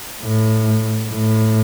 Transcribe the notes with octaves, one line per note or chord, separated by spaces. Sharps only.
A2
A2